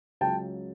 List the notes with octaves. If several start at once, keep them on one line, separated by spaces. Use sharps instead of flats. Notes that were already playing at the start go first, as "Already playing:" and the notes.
C#2 C#3 F#3 G5 A5